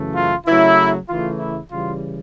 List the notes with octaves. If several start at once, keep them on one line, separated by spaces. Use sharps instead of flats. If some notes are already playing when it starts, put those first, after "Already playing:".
Already playing: F#2 C#3 E3 A3
F4
C#3 F#3 A3 E4
C#3 E3 A3 F4
E4
C#3 E3 G3 F4